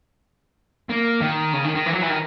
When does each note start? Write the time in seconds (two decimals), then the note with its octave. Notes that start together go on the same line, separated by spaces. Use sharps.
0.89 A#3
1.21 D#3
1.54 C#3
1.64 D#3
1.75 D#3
1.86 E3
1.94 F#3
2.02 E3
2.10 D#3